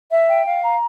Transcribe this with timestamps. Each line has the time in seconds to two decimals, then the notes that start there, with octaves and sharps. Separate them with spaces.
0.11 E5
0.28 G5
0.46 F5
0.64 A#5